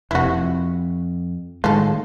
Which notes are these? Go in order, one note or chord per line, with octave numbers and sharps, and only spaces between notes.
F1 C3 E4 F#4
F2
A2 D#3 G#3 F4 A4